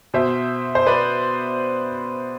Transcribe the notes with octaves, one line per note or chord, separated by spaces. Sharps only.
B2 C5 E5
C5
B4 D5